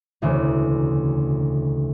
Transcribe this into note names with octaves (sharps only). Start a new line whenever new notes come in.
E1 D2 C#3